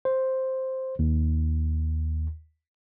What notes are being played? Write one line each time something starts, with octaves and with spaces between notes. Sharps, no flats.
C5
D#2